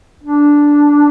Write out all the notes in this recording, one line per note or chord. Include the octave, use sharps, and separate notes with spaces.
D4